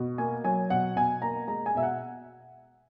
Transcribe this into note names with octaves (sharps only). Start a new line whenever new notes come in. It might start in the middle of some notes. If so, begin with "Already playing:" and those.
Already playing: B2
A#3 G#5
F#3 G#5
B2 F#5
B2 G#5
A#3 A#5
G#3 A#5
G#5
B2 E5
F#5